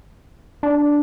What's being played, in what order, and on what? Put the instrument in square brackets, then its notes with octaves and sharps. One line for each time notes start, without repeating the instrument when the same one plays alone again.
[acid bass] D4